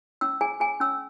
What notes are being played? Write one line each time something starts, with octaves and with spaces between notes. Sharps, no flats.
C#4 E6
G#4 G#5
G#4 G#5
C#4 E6